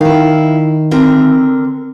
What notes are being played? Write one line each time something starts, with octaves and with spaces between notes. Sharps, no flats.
D#3 E4 F5
D3 C4 A#4